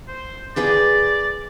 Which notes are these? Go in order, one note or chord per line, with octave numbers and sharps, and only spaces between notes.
C5
G#4 B4 D5 G5